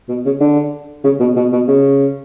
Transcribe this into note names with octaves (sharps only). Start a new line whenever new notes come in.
B2
C#3
D3
C#3
B2
B2
B2
C#3